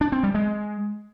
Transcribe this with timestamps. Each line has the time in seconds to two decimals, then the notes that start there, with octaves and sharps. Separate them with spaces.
0.01 D4
0.12 C4
0.23 G3
0.34 G#3